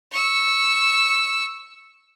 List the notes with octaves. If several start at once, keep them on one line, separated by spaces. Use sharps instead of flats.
C#6 E6